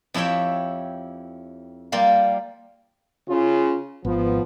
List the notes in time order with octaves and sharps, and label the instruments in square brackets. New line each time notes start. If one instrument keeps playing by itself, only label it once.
[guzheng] F2 E4 G4 C#5 E5 G5
G3 A#3 F4 G4
[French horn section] C#3 F4
[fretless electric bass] G#1 [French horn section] F3 B3